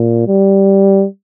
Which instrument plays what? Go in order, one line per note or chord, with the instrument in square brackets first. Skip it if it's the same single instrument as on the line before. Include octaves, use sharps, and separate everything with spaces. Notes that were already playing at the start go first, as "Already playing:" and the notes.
Already playing: [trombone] A#2
G3